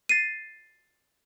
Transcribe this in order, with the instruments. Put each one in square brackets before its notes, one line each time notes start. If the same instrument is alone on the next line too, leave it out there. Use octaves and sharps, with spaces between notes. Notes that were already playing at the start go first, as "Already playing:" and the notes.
[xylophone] A6 C7 D#7